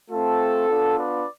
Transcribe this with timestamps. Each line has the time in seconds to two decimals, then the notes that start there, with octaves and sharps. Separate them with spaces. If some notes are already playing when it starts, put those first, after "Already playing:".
0.10 A3 C4 F4 A4
0.69 B3 D4 F4
0.97 B4 D5